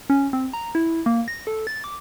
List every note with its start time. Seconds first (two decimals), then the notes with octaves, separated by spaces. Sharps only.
0.10 C#4
0.33 C4
0.53 A#5
0.75 E4
1.06 A#3
1.28 A#6
1.47 A4
1.67 A6
1.84 D6